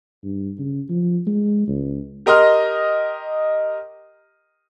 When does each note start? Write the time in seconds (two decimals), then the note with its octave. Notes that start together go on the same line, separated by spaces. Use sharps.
0.24 G2
0.59 C#3
0.89 F3
1.27 G#3
1.68 C#2
2.26 G4 A#4 D#5 C6 F6